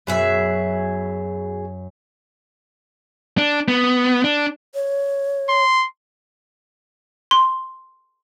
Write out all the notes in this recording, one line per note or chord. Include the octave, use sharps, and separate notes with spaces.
F#2 B2 G#4 E5
D4
B3
D4
C#5
C6
C6